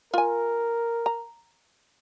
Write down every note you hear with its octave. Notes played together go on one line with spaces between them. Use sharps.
F4 A#4 G#5
A#5